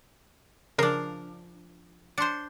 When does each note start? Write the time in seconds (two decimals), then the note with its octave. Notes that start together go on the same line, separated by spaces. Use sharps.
0.78 C#3 F3 D4 A#4 C7
2.18 D4 C5 C6 C#7